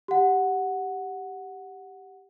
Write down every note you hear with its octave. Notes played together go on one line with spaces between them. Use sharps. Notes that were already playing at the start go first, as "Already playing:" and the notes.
G4 F#5